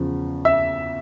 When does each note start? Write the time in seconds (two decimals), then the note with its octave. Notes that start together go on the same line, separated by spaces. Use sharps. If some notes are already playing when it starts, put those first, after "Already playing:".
Already playing: E2 C#3 F3
0.45 E5 E6